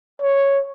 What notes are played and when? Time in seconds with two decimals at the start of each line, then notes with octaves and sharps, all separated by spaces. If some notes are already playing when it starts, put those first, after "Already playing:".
0.22 C#5